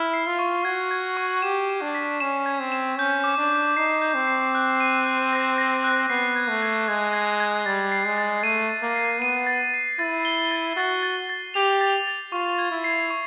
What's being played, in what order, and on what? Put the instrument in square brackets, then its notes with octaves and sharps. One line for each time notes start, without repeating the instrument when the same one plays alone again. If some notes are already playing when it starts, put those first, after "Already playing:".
Already playing: [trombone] E4 [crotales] F6
[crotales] C7
[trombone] F4
[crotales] C#6
[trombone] F#4 [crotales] G#6
[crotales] G#6
C#6
[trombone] G4 [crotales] E7
[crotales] E7
[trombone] D4
[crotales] B6
[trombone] C#4 [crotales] E7
[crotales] G#6
[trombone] C4
[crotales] E7
[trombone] C#4 [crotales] G6
[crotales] D6
[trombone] D4
[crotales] D6
[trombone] D#4 [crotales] C7
[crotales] G6
[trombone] C4
[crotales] C7
F#6
D#7
F#6
A#6
A#6
F#6
[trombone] B3 [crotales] C7
[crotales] G#6
[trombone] A3
[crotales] G#6
[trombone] G#3 [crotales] G#6
[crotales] G#6
G#6
[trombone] G3 [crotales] A6
[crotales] C7
[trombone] G#3
[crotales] A6
[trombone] A3 [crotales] D#7
[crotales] D#7
[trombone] A#3
[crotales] C7
[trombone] B3 [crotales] D#7
[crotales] A6
C7
[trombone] E4 [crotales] A6
[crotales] G7
A6
[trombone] F#4 [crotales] A6
[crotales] A6
A6
[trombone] G4 [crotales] F7
[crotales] A6
A6
[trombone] F4 [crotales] C#6
[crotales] G#6
[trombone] E4
[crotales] C7
C#6